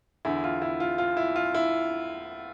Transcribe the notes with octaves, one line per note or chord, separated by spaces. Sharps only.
E2 D3 E4
F4
E4
F4
F4
E4
F4
E4